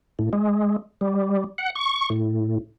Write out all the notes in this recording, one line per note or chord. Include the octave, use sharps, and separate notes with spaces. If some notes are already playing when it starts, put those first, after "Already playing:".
A2
G#3
G3
F#5
C#6
A2